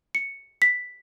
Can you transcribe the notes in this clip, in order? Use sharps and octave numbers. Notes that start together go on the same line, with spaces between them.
C#7
B6